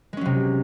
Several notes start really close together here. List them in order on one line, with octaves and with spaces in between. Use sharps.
G#3 C#4 F#3 C3